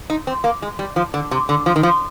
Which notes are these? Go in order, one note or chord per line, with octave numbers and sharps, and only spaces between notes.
D#4
C4
A#3
G#3
G3
F3
D3
C3
D3
F3
D#3
F3